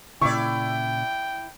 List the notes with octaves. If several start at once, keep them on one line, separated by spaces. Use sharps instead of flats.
A#2 C#3 E4 D5 G5 C#6